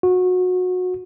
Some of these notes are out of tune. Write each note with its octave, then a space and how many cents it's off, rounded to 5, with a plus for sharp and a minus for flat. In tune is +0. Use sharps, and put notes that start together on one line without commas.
F#4 -25